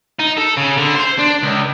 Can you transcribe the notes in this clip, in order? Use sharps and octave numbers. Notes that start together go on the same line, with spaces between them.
D#4
A4
C#3
D3
C5
D4
C#2